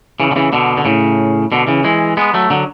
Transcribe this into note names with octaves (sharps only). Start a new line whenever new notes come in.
C#3 E3
D3
C#3 E3
B2 D3
D3
A2 C#3
B2 D3
C#3 E3
E3 G#3
G#3 B3
F#3 A3
D3 F#3